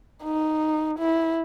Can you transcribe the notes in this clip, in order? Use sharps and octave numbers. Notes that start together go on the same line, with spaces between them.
D#4
E4